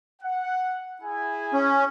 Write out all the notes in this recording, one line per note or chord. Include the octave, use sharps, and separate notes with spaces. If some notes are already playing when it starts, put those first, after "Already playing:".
F#5
E4 G#4 G#5
C#4